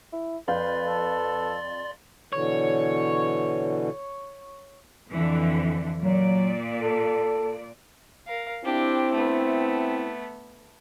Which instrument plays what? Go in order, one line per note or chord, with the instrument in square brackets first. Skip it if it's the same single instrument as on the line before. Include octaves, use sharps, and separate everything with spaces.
[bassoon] E4
[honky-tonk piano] F2 F5 G6 [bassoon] B4 [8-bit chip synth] D5 C6 A6
[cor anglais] A4
[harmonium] B2 D3 E3 [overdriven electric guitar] C#5
[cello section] F2 D3 E3
[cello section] A#2 D5 [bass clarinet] F#3
[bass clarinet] A4
[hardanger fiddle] A#4 F5
[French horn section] C4 E4 [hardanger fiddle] D4 G4
[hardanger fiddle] A3 B3